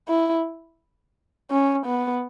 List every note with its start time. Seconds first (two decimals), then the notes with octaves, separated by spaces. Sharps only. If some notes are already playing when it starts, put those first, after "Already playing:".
0.08 E4
1.51 C#4
1.86 B3